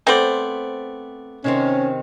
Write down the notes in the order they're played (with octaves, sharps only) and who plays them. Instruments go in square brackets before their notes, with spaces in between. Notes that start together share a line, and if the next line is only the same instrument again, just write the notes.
[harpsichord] A3 B3 D5 [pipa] C4 C5
[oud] C3 D#3 C4 [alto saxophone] C#4